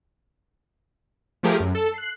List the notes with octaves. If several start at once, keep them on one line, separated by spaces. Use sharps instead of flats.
F3 A3 G4 G#4 A#4
F#2
A4
F#6 C7